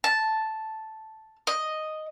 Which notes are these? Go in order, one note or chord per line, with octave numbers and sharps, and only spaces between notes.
A5
D#5